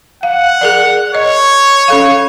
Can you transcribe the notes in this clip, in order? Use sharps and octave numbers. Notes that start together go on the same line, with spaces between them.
F5 F#5
G#4 A#4 D5
C#5 D#5
C#4 A4 F5